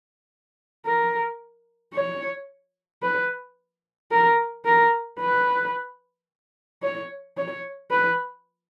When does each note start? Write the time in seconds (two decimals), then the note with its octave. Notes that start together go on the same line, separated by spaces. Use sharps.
0.86 A#4
1.94 C#5
3.02 B4
4.11 A#4
4.65 A#4
5.20 B4
6.83 C#5
7.37 C#5
7.91 B4